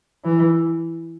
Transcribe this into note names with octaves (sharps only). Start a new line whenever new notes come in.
E3